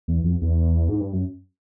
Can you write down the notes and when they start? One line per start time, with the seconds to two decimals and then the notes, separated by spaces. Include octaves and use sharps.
0.08 E2
0.24 F2
0.41 E2
0.89 G#2
1.00 G2
1.13 F#2